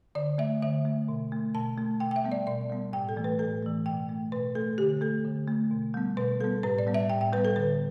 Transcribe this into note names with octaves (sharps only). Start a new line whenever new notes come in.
D3 D5
A3 E5
D3 E5
A3
B2
A3
B2 A5
A3
B2 G5
G5
E5
G3 B3
D5
B2 D5
G3 B3
A2 G5
A4
E3 A3
B4
A2 A4
E3 A3
B2 G5
A3
B2 B4
A3 A4
D3 G4
A3 A4
D3
A3
B2
G3 B3
B2 B4
G3 B3 A4
A2 B4
D5
G3 B3
E5
A2 G5
G5
G3 B3 B4
A4
D3 B4